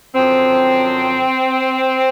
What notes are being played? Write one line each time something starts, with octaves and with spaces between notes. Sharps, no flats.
F#2 D3 F3 C4